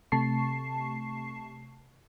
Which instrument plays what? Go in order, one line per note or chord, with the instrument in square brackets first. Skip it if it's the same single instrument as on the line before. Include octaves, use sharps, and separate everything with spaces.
[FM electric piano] C3 A3 A5 C#6 C7